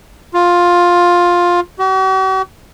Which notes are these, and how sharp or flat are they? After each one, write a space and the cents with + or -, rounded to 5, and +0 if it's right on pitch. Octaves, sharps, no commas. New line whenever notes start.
F4 +10
F#4 +45